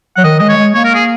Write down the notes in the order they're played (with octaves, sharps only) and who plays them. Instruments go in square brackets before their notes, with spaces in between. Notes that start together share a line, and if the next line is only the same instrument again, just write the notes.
[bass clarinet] F#3 [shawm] F#5
[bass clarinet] D#3 [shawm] D#5
[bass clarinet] G#3 [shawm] D#5
[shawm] C#5
[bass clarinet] G#3
[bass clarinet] A#3 [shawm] C#5
[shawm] A#4
G#4